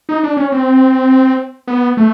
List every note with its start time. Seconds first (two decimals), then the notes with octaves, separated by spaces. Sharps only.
0.09 D#4
0.23 D4
0.37 C#4
0.52 C4
1.68 B3
1.97 A3